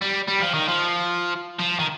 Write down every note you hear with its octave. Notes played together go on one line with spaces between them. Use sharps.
G3
G3
F3
D#3
F3
F3
D#3